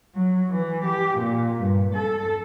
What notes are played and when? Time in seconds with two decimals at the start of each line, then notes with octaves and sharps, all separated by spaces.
0.14 F#3
0.50 E3
0.84 G4
1.18 A#2
1.61 G2
1.94 A4